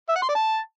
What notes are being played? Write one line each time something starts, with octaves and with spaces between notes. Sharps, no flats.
E5
F#5
C6
D5
A5